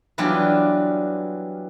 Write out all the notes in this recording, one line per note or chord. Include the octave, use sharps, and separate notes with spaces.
E3 F#3 G3 B3 D4 F4